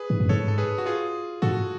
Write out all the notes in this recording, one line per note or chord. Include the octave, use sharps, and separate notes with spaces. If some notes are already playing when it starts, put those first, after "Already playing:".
Already playing: G#4 B4
G#2
F#2
G#2 A4 C#5
A4
G#4 B4
F#4
F4 G#4
G#2 F#4 A4